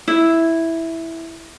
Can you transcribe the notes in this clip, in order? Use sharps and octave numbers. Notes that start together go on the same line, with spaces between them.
E4